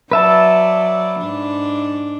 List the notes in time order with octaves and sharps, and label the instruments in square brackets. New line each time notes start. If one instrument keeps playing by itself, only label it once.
[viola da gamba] F#3 D5 [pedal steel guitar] B4 E5 A5
[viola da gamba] G#2 D4